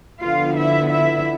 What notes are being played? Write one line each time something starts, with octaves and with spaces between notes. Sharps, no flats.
D3 F3 B3 F4 F5
E4 E5
E4 E5